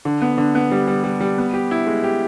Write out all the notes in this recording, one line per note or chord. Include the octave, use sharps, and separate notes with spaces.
D3
B3
D3
B3
G3
G3
G3
G3
B3
G4
E4
G#3
G4